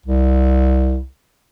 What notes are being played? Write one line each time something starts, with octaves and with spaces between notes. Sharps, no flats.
C2